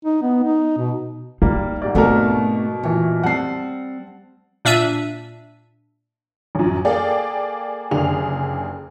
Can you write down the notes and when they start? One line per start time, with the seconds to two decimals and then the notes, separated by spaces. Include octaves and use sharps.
0.05 D#4
0.22 B3
0.43 D#4
0.78 B2
1.42 G3 A#3 D#4
1.82 G#2 G4 D5
1.95 B2 F3 A3 B3 C4 A#4
2.83 A#2 E3 C#5
3.23 G3 C4 F#5 A5 C7
4.65 A#2 D4 E5 E6 D#7
6.55 A1 F#2
6.85 A#3 G#4 A4 D5 F5 G5
7.91 F#1 D3 G4 G#4 F7